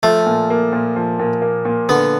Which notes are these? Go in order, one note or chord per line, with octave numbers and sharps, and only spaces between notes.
F3 A3
A#2
A#3
A#2
F3
A#2
A#3
A#2
D3 B3